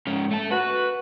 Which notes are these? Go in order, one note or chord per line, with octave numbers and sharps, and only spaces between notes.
G#2 C#4
A3 A5
F#4 B4